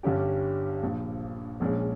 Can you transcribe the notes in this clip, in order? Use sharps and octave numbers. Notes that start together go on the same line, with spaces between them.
G1 G2 G3 C#4 G4
A#1 A#2 F3
A#1 A#2 G#3 C#4